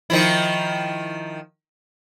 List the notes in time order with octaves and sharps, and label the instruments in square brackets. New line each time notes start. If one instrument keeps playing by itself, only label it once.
[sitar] D#3 F3 E4